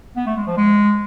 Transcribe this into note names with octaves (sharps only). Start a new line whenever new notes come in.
B3
A3
G#3
F3
G#3